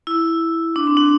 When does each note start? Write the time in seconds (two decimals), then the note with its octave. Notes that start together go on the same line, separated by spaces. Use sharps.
0.07 E4
0.76 D4
0.87 C4
0.97 D4